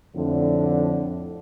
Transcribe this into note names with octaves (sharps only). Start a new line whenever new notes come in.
F2 A2 D3